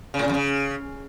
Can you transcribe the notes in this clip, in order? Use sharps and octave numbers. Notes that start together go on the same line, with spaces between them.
C#3
A2
C#3
F2
C#3